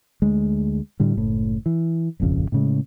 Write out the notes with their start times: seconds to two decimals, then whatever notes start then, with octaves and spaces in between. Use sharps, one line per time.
0.22 D2 G#3
1.00 A2 D3 G3
1.17 F#1 A2
1.66 E3
2.20 D#1 G#1 F2 C#3
2.52 A2 C#3 G#3